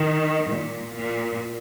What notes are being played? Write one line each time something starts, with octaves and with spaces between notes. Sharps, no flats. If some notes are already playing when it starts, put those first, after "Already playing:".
Already playing: D#3
A#2
A#2